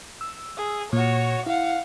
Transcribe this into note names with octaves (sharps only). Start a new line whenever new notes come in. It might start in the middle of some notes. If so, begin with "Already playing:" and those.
E6
G#4
A#2 F#4 C#5
E4 F5 F#5